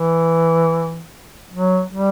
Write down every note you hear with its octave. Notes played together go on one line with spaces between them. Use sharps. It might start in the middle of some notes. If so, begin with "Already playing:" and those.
Already playing: E3
F#3
G3